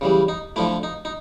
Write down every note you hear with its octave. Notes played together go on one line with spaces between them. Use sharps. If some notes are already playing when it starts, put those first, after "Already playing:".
C#3 E3 G3
D#4
D3 F3 A3 E4
D#4
D#4